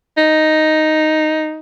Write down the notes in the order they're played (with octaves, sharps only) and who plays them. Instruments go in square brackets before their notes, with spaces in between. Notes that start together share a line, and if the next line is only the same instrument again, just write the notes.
[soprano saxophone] D#4